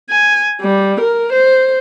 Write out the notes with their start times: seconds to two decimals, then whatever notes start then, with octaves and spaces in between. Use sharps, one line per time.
0.10 G#5
0.61 G3
1.00 A#4
1.32 C5